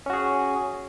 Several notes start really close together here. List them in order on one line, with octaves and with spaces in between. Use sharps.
C#4 F#4 G#4